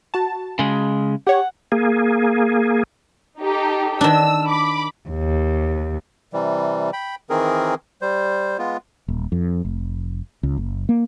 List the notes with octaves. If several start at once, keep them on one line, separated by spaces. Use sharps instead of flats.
F#4 A5
C#3 G#3
G4 C#5 F#5
A#3 G#4
D#4 G4 A4
D#3 D4 E6
B5 D6
D#2
C3 E3 G3
G5 B5
D#3 E3 C4 G#4 A#4
G3 C5
G#3 B3 F4
D#1
F2
F1
C#2
F#1
A#3